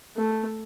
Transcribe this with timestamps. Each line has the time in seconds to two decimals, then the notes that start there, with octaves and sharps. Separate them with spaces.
0.17 A3